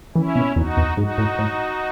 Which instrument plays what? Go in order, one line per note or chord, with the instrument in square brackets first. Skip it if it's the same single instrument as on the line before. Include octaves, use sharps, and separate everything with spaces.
[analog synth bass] E3 [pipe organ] C#4 E4
[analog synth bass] B2
[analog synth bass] E2 [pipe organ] D#4 F#4
[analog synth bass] E2
[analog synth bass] G#2 [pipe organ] D#4 F#4
[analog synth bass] A2
A2